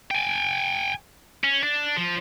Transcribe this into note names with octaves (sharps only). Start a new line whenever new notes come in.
G5 G#5
C#4
D4
F3